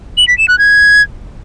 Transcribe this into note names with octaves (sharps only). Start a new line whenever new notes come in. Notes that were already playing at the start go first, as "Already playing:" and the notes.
F#7
B6
E7
F#6
G#6